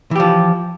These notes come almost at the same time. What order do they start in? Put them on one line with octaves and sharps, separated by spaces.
E3 G4 F3